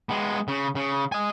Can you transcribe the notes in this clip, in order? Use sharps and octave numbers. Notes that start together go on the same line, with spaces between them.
G#3 B3
C#3
C#3
D#5 G#5